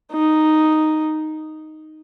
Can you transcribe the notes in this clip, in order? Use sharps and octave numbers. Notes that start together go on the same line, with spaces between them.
D#4